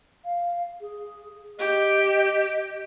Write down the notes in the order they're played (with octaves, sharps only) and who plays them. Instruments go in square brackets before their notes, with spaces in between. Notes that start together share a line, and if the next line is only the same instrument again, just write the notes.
[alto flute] F5
G#4
[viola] G4 [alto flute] D#5